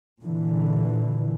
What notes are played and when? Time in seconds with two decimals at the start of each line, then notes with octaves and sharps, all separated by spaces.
0.21 A#2 D3 E3